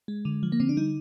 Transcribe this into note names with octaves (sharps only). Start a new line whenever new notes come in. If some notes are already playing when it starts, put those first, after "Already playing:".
G#3
D3
F3
A#3
D3 C4
D4
G3 D#4